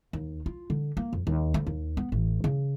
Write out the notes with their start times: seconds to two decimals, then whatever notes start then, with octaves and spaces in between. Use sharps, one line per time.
0.13 D#2
0.46 F4
0.70 D3
0.97 A#3
1.13 F2
1.27 D#2
1.54 D2
1.67 D#2
1.97 B3
2.12 A1
2.44 C#3